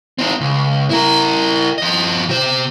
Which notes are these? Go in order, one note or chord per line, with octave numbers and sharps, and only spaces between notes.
C4 D#4
C#2
E4 A#4
F3 D#5
C3 C5